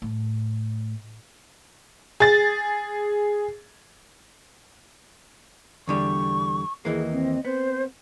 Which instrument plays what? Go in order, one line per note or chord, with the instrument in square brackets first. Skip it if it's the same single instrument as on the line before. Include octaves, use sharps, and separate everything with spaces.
[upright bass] A2
[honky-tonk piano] G#4 A6
[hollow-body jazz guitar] E2 D3 G3 [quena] C#6
[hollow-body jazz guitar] D#2 E3 A#3 [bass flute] G#4 [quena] D#5
[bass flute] C4
[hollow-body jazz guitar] B3 [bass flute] C4 [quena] C5